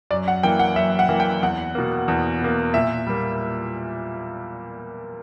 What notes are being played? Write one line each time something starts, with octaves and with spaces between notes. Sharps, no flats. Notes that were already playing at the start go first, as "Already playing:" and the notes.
F#2 D5
F#5
E3 A#3 G5
F#5
F#2 E5
F#5
E3 A#3
G5
E2 F#5
B2 A#3
E2
B2 A#3
A#2 E5
G3 A#3